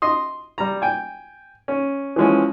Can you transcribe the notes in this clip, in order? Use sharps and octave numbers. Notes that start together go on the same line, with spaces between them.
D#5 C6 D#6
G3 A#5
G5 G#5
C#4
E3 F3 G#3 C#4